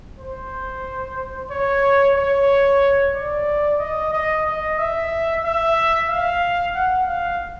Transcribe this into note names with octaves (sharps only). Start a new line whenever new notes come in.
C5
C#5
C#5
D5
D#5
D#5
D#5
E5
E5
F5
F#5
F5